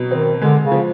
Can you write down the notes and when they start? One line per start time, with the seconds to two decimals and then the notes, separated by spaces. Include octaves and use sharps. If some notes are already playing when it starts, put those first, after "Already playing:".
Already playing: B2 F#3
0.11 D#3 C4
0.41 D3 G#3
0.64 C#3
0.72 F3